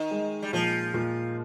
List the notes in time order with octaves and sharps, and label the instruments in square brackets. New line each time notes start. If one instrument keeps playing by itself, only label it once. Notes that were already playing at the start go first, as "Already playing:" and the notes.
Already playing: [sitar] D#3 [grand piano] D#4
[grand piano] G#3
[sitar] G3
[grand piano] A#2 [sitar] F3
[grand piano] A#2